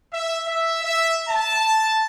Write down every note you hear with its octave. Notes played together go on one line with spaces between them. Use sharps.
E5
E5
E5
A5